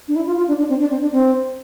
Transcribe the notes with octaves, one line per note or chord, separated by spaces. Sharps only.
D4
E4
F4
F4
D4
D4
C4
D4
C4
D4
C4